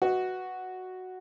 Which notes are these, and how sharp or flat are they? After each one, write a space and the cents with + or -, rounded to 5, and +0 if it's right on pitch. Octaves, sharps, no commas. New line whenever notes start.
F#4 +0 B4 +0 D#5 +15